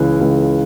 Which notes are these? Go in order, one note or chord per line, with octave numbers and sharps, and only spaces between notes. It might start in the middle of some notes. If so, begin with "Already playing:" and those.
Already playing: C#2 C#3 E3
C#2